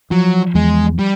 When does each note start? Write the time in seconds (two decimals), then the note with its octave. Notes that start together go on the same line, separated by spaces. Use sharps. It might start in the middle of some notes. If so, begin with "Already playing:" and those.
0.11 F3 F#3
0.55 E2 G#3
0.99 G3